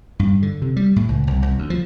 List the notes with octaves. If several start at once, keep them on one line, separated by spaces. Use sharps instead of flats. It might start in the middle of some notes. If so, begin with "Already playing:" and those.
G2
D3
C3
G3
A2
C#2
C2
C2
D2
F3